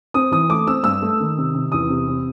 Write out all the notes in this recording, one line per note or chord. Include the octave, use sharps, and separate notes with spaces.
C4 D#6
E3 D#6
A3 D6
C4 E6
G2 E6
A3
D#3
C3
C3
E2 D#6
C3
C3